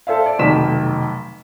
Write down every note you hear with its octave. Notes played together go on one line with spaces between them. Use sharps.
A4 C5 E5 F5
D5
F1 B1 D#3 B6 E7